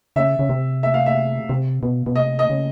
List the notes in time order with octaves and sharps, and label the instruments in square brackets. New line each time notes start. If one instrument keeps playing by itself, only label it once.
[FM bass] C#3 [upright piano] E5
[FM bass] C#3
C3
[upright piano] E5
F5
E5
[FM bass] C3
B2
B2
[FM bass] C3 [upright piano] D#5
[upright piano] D#5
[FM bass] C#3